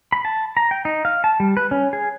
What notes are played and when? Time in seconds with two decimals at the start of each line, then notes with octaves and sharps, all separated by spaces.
0.12 B5
0.25 A5
0.57 A#5
0.71 G5
0.85 D#4
1.05 F5
1.24 A5
1.40 G3
1.57 B4
1.71 C#4
1.93 G#4